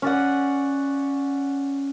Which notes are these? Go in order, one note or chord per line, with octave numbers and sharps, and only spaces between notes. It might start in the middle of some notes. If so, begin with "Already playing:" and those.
C#4 D5 F#5